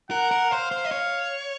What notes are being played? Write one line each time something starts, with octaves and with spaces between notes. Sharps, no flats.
A#4 F#5
A#4
C5 F5
C5
D#5
C#5